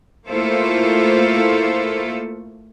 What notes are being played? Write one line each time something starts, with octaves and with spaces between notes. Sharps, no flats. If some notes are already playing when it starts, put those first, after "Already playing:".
A3 A#3 E4 F4 A4 C5